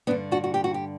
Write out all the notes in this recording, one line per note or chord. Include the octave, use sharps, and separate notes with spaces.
G2 D3 B3 D4
D4 F#4
F#4
G4
F#4
G4